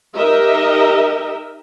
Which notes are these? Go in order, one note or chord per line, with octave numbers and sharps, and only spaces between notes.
D#4 G4 A#4 D#5 E5